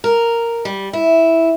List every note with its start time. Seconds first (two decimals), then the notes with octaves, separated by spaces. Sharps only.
0.04 A#4
0.65 G3
0.93 E4